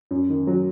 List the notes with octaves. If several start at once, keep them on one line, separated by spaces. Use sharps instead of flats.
F#2
D#3
F#3